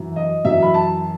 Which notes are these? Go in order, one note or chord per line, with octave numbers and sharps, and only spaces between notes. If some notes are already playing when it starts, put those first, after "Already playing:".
Already playing: F#2 E3
D#5
F#2 E3 E5
B5
A5